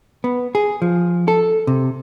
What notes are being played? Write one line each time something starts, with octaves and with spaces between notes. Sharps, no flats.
B3
G#4
F3
A4
C3